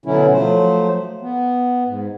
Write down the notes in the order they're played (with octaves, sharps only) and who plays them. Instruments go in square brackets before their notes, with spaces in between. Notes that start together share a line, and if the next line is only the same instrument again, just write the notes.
[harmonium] B2 D3 F#3 C#4 E4
F3 F#3 A3 C5
B3
G#2